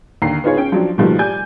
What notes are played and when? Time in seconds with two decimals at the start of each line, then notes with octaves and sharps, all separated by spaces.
0.22 D#2 D3 A#5 C7
0.44 B3 D#4 F4 G#4 C#5
0.57 C#4 G5
0.72 F3 F#3 D4
0.98 B2 D#3 F3 G3 A3 A#3
1.19 G3 D5 G#5 G6